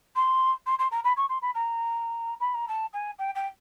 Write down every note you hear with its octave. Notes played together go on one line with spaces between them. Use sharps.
C6
C6
C6
A#5
B5
C#6
C6
B5
A#5
B5
A#5
A5
G#5
G5
G5